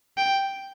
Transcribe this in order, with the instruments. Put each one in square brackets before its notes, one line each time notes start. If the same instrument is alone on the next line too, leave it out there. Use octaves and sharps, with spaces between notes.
[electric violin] G5